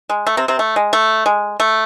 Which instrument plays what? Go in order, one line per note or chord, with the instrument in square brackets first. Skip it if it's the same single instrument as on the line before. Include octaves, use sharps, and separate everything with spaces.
[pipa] G#3
A3
C3 C4
C3 C4
A3
G#3
A3
G#3
A3